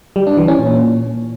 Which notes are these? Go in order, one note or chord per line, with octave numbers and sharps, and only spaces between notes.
G3
D4
E3
C#4
A#2